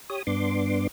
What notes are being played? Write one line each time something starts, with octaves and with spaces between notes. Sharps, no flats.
G4 C#5 D#6
G2 B3 D4 C6 D6